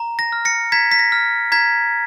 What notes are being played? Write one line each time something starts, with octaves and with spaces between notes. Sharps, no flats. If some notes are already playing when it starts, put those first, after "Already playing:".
Already playing: A#5
A#6
F6
A#6 C#7
A#5 G#6 B6
B6
A#6
F6
A#5 G#6 B6